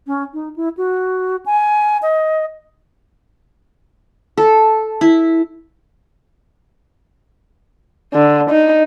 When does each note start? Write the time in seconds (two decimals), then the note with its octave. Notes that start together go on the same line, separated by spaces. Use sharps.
0.07 C#4
0.34 D#4
0.56 E4
0.77 F#4
1.46 G#5
2.02 D#5
4.37 A4
5.01 E4
8.14 D3
8.50 D#4